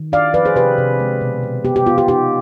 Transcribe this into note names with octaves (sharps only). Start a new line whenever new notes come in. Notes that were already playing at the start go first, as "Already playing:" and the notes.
Already playing: D#3
D4 D5 F5
F3 B4 D5
G#4 C5
C3 G4 B4
C3
G#3
B2
B2
B3 G4
G4
B3 F4
G4
D#4 G4